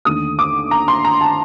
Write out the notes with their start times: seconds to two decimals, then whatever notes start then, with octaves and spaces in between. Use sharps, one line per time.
0.05 D#2 D3 A3 D#6
0.39 D6
0.71 A#5
0.88 C6
1.05 A#5
1.21 A5